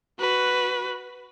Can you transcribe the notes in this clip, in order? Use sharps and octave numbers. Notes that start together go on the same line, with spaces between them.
F#4 B4